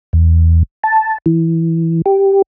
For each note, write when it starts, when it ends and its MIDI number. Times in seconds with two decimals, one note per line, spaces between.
0.13 0.63 40
0.84 1.18 81
1.26 2.02 52
2.06 2.42 67